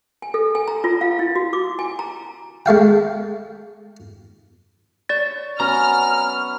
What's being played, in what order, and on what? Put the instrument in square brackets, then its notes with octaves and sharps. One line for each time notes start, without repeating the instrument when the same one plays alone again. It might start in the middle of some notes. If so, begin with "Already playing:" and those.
[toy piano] G#5
A4
G#5
A#5
F4
F5
E4
F#4
D6
G#5
A#5
[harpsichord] G#3 A3 F5 G5
[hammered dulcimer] C#5 [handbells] D5 A6
[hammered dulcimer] F#3 B3 C#4 [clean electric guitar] A#5 [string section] F6